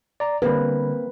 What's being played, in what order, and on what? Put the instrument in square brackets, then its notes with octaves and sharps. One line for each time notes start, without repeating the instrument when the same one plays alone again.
[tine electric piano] D5 A#5
[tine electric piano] D3 G3 [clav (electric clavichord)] A#3 C4 [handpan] B4